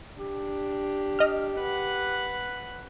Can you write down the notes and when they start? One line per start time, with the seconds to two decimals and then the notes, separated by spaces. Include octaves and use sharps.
0.19 D4 G4
1.19 D#5 F6
1.60 B4 F#5